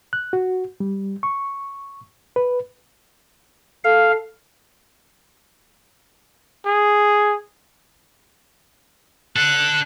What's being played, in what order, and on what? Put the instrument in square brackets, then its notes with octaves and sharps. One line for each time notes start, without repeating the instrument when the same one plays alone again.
[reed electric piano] F#6
F#4
G3
C#6
B4
[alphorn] A4 [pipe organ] F5
[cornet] G#4
[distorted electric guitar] D4 A4 [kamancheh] F#6